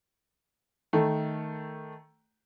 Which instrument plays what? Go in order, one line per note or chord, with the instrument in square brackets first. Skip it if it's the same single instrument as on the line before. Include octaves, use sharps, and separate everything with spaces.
[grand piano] D#3 A3